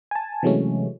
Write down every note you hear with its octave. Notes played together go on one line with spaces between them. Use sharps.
G#5 A5
C3 E3 F#3 G#3 A3 C#4